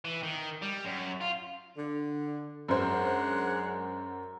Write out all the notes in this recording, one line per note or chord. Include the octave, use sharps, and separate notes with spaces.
E3
D#3
G3
F#2
F4
D3
F#2 G#3 D4 C5 F#5